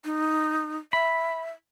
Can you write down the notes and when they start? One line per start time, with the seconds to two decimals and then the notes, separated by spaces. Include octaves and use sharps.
0.05 D#4
0.93 E5 B5